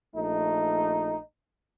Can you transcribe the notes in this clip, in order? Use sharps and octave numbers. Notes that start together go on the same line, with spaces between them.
A#1 A3 D#4